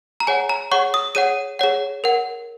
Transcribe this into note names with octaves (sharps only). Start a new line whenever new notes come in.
A#5
G#4 C#5 F#5 G#5
A#5
G#4 C#5 F#5 C#6
D#6
G#4 C#5 F#5 D#7
G#4 C#5 F#5
A#4 F#5